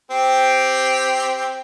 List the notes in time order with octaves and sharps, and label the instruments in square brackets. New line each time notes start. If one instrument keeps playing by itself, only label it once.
[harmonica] C4 G4